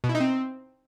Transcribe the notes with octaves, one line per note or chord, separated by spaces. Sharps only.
B2
E4
D#4
C4